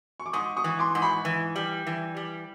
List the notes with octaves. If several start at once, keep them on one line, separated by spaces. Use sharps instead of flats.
C#6
D6
G#2 C#6 D#6
C#6 D#6
E3
C6 D6
G#2
B5 C#6
E3
G3
E3
G3